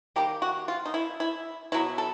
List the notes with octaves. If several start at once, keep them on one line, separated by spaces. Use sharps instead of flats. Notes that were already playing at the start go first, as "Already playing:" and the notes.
D#3 G3 A#3 G4
F#4
F4
D#4
E4
E4
B2 F#3 B3 E4
A4